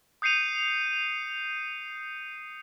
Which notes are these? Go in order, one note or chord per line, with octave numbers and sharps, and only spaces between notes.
D#6 G6 C7 C#7 D#7 F7